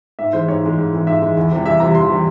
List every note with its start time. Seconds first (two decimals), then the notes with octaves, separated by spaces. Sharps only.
0.19 G#2 E5
0.33 E3 G#3 C5
0.48 G#2 C#5
0.63 E3 G#3
0.78 G#2
0.92 E3 G#3
1.07 G#2 E5
1.22 E3 G#3
1.37 E2
1.51 C3 E3 G3
1.66 E2 E5
1.80 C3 E3 G3 A#5
1.95 E2 C6
2.10 C3 E3 G3